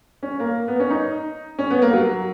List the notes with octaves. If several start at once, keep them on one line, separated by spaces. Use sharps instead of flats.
C#4
A#3
B3
C#4
D#4
C#4
B3
A#3
F#3